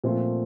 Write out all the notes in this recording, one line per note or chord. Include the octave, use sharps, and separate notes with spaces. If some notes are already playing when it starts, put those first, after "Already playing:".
A#2 F3 A3 C4 F4